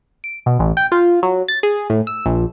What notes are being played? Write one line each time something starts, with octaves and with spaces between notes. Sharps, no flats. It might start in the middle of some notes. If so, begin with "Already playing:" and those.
D7
B2
A1
G5
F4
F#3
A6
G#4
A2
E6
A#1